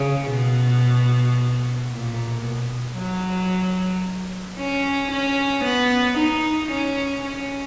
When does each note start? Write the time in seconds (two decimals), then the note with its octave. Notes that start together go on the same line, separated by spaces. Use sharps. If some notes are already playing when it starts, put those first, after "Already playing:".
Already playing: C#3
0.31 B2
1.91 A#2
2.44 B2
2.98 F#3
4.57 C#4
5.11 C#4
5.64 B3
6.18 D#4
6.71 C#4
7.24 C#4